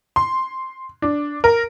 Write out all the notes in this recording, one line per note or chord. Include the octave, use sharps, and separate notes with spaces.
C6
D4
A#4